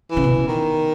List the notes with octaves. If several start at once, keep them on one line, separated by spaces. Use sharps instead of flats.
E3
C#3
B2
D#3